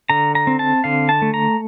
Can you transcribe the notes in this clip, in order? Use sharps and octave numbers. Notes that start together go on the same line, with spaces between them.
D3 A#5
A#5
C4
A5
D3 F5
A5
A3
A#5